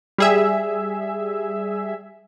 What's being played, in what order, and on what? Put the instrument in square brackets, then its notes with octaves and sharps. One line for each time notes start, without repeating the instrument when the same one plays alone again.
[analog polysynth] G3 G#4 E5